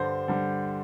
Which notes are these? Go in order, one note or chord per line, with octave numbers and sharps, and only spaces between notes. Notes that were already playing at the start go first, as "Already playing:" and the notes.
Already playing: G2 D3 G3 C5
D3 G3